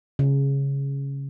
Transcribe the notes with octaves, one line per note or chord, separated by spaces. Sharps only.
C#3